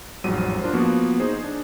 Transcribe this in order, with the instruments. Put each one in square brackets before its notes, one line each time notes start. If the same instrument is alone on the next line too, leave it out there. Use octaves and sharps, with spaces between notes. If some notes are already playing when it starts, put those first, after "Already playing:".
[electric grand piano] A1 F2 G#2 F#3 G3 D#7
D4 F4 A#4 C5
F3 A#3 B3 F#4
D#4 G#4 C5
D4